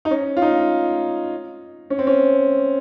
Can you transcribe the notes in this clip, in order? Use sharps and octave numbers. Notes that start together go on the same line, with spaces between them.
D#4
C#4
F4
D#4
C#4
C4
C#4